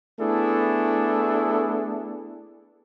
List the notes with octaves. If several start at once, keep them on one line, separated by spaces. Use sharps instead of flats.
A3 B3 D4 E4 G#4 A4